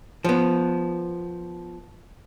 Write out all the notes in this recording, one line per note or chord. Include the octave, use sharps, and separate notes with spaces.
F3 B3